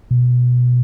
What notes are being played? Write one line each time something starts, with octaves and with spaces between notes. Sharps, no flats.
B2